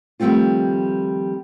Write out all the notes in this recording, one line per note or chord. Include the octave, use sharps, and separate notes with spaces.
D#3 F3 G3 A3 C4 F4